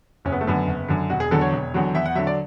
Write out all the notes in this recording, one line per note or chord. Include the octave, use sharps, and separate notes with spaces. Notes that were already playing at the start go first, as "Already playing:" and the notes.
F#1 C#4
B3
A3
F#2 D3 B3
F#1
F#2 D3
E1 F#4
G#4
E2 D3 F#3 A4
C#5
E1
E2 D3 F#3
E2 E5
F#5
D3 F#3 E5
D5